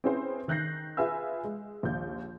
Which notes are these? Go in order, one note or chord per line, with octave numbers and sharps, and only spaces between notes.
C4 C#4 E4 G#4 B4 C5
D#3 F#6 G6 A#6 C7
F4 G#4 B4 E5 G#5 E6
G#3
A#1 D#2 G6